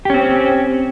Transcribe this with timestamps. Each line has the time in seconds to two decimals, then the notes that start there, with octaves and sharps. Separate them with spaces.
0.05 G4
0.10 C#4
0.14 C4